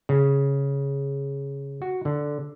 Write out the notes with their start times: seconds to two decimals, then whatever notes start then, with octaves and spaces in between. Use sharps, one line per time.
0.09 C#3
1.82 F#4
2.05 D3